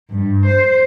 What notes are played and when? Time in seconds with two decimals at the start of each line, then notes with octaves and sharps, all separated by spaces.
0.11 G2
0.45 C5